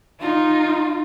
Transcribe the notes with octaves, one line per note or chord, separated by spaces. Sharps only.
D#4 F4